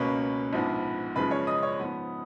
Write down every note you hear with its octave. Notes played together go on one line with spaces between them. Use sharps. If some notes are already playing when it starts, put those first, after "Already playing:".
Already playing: C#2 B2 A#3 C#4 B4 B5
A#1 G#2 F3 B3
F#2 C#3 F3 G#3 B4 B5
C#5 C#6
D#5 D#6
C#5 C#6
G#2 F3 B3